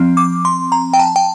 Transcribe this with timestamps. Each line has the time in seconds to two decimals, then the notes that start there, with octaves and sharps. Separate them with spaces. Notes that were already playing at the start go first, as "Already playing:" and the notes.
Already playing: F3 C4
0.17 D6
0.45 C6
0.72 A#5
0.93 G5
0.99 A5
1.16 G5